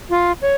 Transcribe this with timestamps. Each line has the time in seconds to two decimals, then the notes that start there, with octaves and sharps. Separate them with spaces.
0.10 F4
0.42 C#5